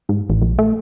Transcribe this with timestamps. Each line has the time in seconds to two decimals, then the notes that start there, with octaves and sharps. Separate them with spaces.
0.09 G#2
0.30 A1
0.42 A#1
0.59 A3